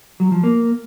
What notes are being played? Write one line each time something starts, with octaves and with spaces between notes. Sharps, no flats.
F#3
F3
A#3